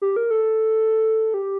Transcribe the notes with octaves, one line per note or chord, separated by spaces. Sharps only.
G4
A#4
A4
G4